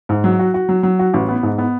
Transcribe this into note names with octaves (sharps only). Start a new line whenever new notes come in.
G#2
F#3
F#4
F#4
F#3
F#3
F#4
A1
B3
G#2
B3